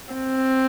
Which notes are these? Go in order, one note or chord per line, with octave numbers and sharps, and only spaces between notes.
C4